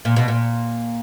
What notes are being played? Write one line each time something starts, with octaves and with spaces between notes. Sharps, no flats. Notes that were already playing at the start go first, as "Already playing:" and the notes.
A#2
B2
A#2